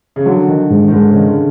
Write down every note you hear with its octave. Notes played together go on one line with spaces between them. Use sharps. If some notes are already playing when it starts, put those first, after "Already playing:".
C#3
D3 F#3
D#3
G#2
D#3
G#2 D3
C#3
D#3
D3